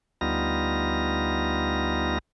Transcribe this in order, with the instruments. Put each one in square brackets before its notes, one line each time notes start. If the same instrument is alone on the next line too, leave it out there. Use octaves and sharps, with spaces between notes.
[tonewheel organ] D2 G3 B3 D#4 F4 A#6